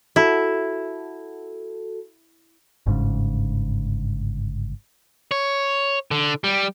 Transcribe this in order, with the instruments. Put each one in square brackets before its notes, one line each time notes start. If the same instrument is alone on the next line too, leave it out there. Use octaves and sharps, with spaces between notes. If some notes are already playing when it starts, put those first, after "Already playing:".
[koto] E4 [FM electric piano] F#4 A4
[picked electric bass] G1 G#2 C#3
[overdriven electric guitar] C#5
D3
G3